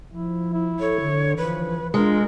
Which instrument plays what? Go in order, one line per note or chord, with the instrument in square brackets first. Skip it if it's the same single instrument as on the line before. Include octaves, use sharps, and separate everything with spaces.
[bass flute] F3 [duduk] E4
[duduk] E4
[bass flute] A4 [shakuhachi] C#5
[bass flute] D3
[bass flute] E3 [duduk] F3 [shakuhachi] B4
[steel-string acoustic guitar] G#3 [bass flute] D4 [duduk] F4 [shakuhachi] A#4